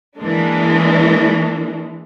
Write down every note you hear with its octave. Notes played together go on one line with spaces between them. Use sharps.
E3 G#3 A#3 D4